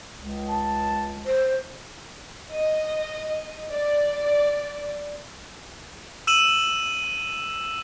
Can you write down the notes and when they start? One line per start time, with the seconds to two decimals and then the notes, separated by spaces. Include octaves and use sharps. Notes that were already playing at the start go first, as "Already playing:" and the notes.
0.17 C#2
0.50 A5
1.26 C5
2.52 D#5
3.72 D5
6.27 E6 D#7 E7 F#7